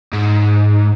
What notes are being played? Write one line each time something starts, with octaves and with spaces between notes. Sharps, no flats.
G#2